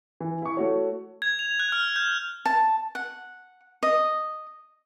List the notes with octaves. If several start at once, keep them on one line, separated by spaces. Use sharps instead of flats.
E3
E4 C#6
A3 F#4 C#5
G#6
F7
F#6
F6
G6
A5
F#5
D#5